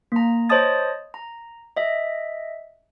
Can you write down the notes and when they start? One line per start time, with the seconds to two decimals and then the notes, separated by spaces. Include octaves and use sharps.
0.12 A#3 A#5
0.49 C5 C#5 D#5 A5 D#6 A6
1.14 A#5
1.77 D#5 E5